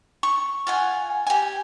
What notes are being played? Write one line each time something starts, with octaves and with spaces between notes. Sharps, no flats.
C#6
F4 F#5 G#5
G4 G#5